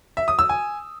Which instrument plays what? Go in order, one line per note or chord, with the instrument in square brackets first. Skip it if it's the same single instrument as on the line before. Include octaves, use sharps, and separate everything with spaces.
[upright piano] E5
D#6
E6
G#5